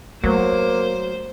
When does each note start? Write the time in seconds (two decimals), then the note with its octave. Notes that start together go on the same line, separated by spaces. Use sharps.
0.24 F#3 A3 A#3 C5